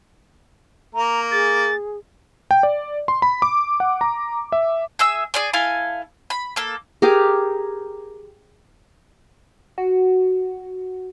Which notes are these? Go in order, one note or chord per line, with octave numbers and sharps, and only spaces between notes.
A#3 A#5
G#4 A6
G5
D5
C6
B5
D6
F#5
A#5
E5
G#4 E5 E6
G#4 D5 G#5
E4 A4 F5 G#5
B5
A#3 A4
G4 G#4 A#4
F#4